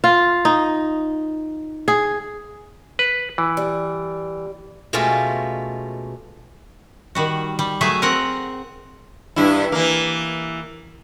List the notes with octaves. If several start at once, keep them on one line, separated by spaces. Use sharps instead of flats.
F4
D#4
G#4
B4
E3
G3
B2 G#3 A3 C#4 F4 G4
D#3 G3 F#4
G3
F#3 A3 G#4 E5
C4 A#4 F#5
G2 E4
E3 A#3